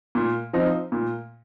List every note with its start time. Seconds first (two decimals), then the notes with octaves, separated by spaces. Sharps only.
0.15 A#2
0.53 F3 C4 D#4
0.92 A#2